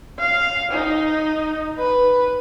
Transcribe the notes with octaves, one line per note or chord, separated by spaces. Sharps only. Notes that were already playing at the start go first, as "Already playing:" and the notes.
F5
D#4
B4